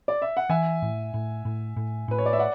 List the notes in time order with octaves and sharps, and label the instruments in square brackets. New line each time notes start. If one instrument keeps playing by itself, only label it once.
[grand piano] D5
E5
F#5
[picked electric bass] E3 [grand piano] E5 G#5
[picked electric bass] A2
A2
A2
A2
[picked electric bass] A2 [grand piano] B4
[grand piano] C#5
D5
E5
D5 F#5